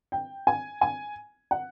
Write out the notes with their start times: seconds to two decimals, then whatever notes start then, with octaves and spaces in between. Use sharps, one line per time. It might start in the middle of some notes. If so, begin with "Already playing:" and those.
0.12 G5
0.47 G#5
0.81 G#5
1.51 F#5